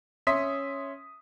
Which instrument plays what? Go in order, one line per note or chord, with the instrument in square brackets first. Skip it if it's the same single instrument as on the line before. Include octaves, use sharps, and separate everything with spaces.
[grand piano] C#4 E5 C6 D#6 B6